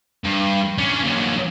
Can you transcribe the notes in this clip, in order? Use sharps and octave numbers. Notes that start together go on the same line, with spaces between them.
G2
C#4 D4
A#2 F#3